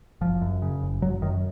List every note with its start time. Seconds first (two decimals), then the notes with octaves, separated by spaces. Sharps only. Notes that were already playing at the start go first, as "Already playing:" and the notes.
0.21 F#1 F3
0.41 F#2
0.62 C#3
0.82 F#1
1.02 F#1 F#3
1.22 F#2 D#3